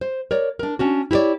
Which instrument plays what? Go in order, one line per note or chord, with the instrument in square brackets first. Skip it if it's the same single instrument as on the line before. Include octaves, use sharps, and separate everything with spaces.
[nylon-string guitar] C5
A#4 C#5 D5
D4 A#4
C#4 D4 F#4
E4 G4 A#4 C#5 D5